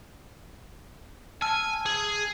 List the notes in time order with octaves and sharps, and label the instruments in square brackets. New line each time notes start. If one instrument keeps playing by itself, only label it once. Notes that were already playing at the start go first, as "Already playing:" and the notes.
[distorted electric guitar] G#5 [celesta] A5 E6 F6
[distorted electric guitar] G#4